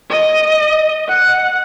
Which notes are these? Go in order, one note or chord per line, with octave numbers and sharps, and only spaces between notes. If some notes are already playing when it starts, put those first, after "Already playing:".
D#5
F#5